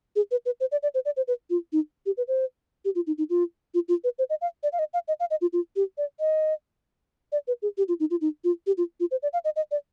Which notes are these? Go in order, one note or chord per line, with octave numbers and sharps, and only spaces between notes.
G#4
B4
B4
C5
D5
D5
C5
D5
C5
B4
F4
D#4
G4
B4
C5
G4
F4
D#4
D#4
F4
F4
F4
B4
C5
D#5
F5
D5
F5
D#5
F5
D#5
F5
D#5
F4
F4
G4
D5
D#5
D5
B4
G#4
G4
F4
D#4
F4
D#4
F4
G4
F4
F4
C5
D5
F5
D#5
D#5
D5